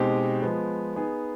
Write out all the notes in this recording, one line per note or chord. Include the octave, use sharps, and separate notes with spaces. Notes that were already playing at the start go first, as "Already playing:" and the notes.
Already playing: B2 G#3 C4 D#4 G4
F3 G#3 B3
B3 D#4 G#4